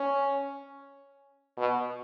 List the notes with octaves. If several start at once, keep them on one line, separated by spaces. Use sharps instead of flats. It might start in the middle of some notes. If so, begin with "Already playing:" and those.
Already playing: C#4
B2